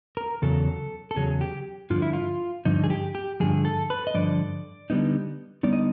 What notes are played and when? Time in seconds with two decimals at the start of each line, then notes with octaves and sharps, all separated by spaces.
0.17 A#4
0.42 E2 C#3 F#3 A4
1.11 A4
1.16 E2 C#3 F#3 G#4
1.41 G4
1.90 G2 D3 F3 F4
2.02 E4
2.13 F4
2.65 G2 D3 F3 D#4
2.84 G#4
2.90 G4
3.15 G4
3.40 G2 D3 F3 G#4
3.65 A4
3.90 B4
4.07 D#5
4.14 G2 D3 F3 D5
4.90 D3 G3 B3 D#4
5.63 D3 G3 B3 D#4 D5
5.73 D#5